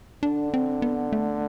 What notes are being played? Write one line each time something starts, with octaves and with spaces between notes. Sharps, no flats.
D3 D4
C4
B3
A3